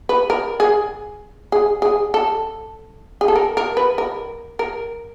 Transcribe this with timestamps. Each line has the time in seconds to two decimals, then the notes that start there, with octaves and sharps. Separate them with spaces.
0.09 B4
0.30 A#4
0.60 G#4
1.52 G#4
1.82 G#4
2.14 A4
3.21 G#4
3.28 A4
3.36 A#4
3.57 A#4
3.77 B4
3.98 A#4
4.59 A#4